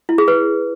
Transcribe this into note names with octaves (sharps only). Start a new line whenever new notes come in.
E4
G#4
B4